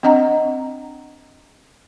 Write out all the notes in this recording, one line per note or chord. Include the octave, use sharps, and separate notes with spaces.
C4 D4 D#5 F#5 A#5